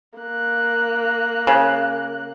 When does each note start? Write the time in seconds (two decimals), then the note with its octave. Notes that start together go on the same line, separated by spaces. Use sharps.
0.19 A#3 F#6
1.47 C#3